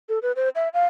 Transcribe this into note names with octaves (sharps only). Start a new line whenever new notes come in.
A4
B4
C5
E5
F5